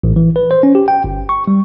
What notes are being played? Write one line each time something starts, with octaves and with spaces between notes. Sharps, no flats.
A1
E3
B4
C5
C#4
G4
G5
G1
C#6
G3